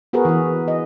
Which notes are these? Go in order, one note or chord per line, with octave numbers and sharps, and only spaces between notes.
B3 F#4 G#4 A#4 B4
E3 F#4
D#5